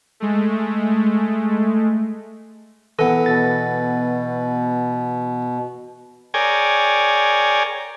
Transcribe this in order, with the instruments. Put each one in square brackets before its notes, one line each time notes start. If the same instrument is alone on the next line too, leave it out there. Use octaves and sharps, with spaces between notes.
[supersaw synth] G#3 A3
[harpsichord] E3 B3 [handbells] A4
[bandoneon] B2 [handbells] A6
[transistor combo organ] G#4 A#4 C#5 D5 G5 G#5